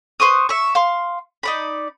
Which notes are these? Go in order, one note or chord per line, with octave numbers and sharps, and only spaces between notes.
B4 C5 C#6 D#6
E5 C#6
F5 C6
D#4 D5 B5